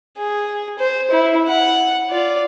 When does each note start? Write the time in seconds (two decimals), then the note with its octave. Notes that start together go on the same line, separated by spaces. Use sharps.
0.17 G#4
0.79 C5
1.11 E4
1.48 F#5
2.10 F4 D5